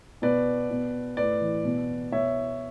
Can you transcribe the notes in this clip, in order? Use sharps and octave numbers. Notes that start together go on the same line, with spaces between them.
B2 B4 D5
B2
A2 B4 D5
E3
B2
B2 C#5 E5